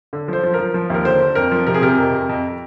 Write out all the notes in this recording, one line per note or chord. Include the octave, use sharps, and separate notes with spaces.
D3
F3 C5
F3
F3 A#4
F3
D#2 A#4
D3 C5
D3
F2 A#4
F3
C3 A#4
G#4
C3 A#4
F2
F2
F2